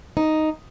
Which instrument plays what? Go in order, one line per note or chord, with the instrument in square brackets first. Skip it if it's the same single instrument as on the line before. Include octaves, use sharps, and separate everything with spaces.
[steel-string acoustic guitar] D#4